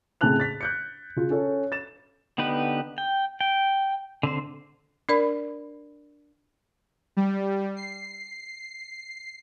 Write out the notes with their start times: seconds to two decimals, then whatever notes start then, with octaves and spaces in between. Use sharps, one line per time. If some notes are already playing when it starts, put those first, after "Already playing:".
0.21 A2 C#3 C4 A5 F#6 F7
0.40 A6 B6
0.61 F#6 G6 C#7
1.16 C#3 F4
1.30 C#4 A4 C#5
1.72 A6 E7
2.38 D3 B3 D#4 G4 B4
2.98 G5
3.41 G5
4.23 D3 C4 C5
5.09 D4 A#4 D5 B5
7.17 G3
7.76 C7